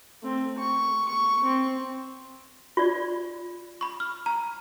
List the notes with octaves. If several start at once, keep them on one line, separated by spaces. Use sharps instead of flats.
A3 C4
C#6
C#6
C4
F4 D5
B5 C#6
F6
A#5